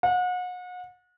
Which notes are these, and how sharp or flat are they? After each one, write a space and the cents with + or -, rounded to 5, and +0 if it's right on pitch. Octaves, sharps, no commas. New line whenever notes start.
F#5 -35